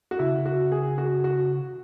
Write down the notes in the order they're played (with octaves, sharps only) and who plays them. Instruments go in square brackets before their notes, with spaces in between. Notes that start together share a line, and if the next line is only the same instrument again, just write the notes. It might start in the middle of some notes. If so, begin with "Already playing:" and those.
[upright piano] F#4
[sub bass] C#3 [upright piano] E4
[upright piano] F#4
G#4
F#4
F#4